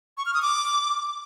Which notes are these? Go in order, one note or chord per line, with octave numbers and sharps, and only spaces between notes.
C#6
F6
D#6
D6